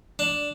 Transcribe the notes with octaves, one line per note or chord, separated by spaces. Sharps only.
D4